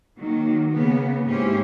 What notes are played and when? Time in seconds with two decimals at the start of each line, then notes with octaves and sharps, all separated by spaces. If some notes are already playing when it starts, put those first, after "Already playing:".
0.18 D#3 F#3 A#3
0.70 C#3 A#3 B3
1.26 G#2 C#4 E4 G4 C5